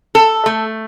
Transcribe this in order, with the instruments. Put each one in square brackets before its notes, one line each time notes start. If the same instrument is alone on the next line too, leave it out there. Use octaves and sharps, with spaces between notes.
[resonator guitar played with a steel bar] A4
A3